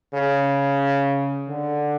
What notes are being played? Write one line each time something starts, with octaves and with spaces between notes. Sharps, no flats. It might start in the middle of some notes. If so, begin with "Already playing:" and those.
C#3
D3